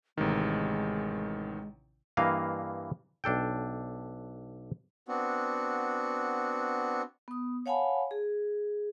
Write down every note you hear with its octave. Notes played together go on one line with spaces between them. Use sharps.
A1 C3 D#3 G#3
G2 E3 A#3 D#5 F5
B1 D4 A4 G5
B3 C4 D4 F#4
B3 D#6
C#5 F5 F#5 G#5 A5 B5
G#4